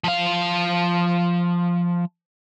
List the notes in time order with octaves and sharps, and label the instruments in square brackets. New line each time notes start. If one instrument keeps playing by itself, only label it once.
[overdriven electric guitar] F3 F5